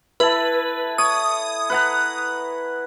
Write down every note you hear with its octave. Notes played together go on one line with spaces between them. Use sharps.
E4 A4 B4
C#5 D#6
B4 F#5 A#5